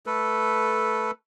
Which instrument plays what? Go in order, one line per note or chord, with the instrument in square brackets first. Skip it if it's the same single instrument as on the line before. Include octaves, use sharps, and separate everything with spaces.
[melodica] A3 A4 B4